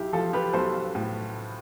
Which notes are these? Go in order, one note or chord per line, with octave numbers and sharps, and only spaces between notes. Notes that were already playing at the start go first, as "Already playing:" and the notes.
Already playing: B1 E4 G4
F3 F4 A4
G4 B4
B1 A4 C5
A2